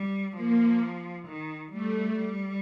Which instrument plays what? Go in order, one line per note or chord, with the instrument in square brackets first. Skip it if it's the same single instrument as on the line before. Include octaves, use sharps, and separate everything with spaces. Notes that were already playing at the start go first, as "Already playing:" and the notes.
Already playing: [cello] G3
[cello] F3 [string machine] A#3
[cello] D#3
[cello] G3 [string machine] A3
[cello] G3